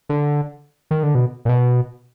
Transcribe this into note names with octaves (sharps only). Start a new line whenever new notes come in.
D3
D#3
D3
B2
A#2
B2